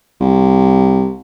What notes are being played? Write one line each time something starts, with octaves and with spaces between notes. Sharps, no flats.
C2